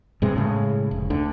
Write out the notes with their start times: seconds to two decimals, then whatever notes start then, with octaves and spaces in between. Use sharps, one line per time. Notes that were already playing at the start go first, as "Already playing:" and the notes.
0.22 G2 C3 G#3
0.36 A2 C#3 G#3
0.91 F1
1.10 D2 D3